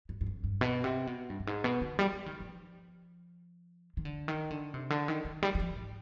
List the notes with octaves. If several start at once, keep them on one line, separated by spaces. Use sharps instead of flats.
G2
G2
F2
G2
B2
C3
B2
G2
G2
G#2
B2
D3
G3
F3
D#3
F3
D#3
D3
D#3
D3
C3
D3
D#3
D#3
G3
G3
F3
G#2